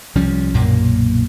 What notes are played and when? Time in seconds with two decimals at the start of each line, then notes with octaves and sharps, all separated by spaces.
0.15 C2 F3 G3 C#4
0.54 B1 F#2 A#2 A#3